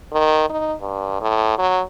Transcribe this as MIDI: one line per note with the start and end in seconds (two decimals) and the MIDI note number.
0.12 0.46 51
0.50 0.74 63
0.81 1.20 43
1.21 1.55 45
1.58 1.81 54